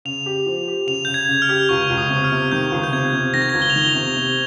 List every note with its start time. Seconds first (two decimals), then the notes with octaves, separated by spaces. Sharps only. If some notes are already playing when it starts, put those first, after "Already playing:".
0.05 C#3 F7
0.26 G4
0.46 F3
0.67 G4
0.87 C#3 F7
1.05 C#3 G6
1.14 G#6
1.29 C#3
1.42 F6
1.49 G4
1.69 C#2 C#6
1.90 C#2
1.97 D#6
2.10 C3
2.24 F6
2.32 C3
2.52 D#3 G6
2.72 C#2
2.84 G6
2.93 C3 G#6
3.13 C3
3.34 D#3 A#6
3.42 G#6
3.49 A#6
3.54 C#2
3.62 G7
3.70 F7
3.76 D#3 G7
3.89 F7
3.95 C3
4.16 C3